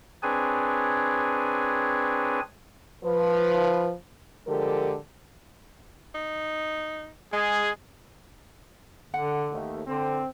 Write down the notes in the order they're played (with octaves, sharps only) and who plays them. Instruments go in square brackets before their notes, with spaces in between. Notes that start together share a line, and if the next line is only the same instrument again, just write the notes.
[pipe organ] C4 D4 G#4 B4 C#5 G#5
[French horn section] F3 B4
D3 F3 G#3 G4 A4 A#4
[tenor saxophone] D#4
[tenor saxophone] G#3 [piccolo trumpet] G#4
[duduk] D3 [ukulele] F#5
[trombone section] D#2 A3
[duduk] D3 [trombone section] C4